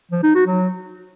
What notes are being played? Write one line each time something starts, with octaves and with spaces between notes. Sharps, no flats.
F3
D#4
F#4
F#3